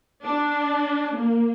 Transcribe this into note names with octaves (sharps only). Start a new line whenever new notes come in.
D4
A#3